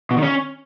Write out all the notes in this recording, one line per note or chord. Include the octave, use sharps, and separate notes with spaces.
B2
D#3
C#4